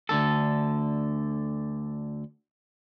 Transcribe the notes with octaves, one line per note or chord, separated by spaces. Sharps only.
D2 D3 A4